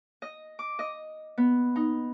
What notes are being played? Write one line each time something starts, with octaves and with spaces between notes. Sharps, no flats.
D#5
D6
D#5
B3
D#4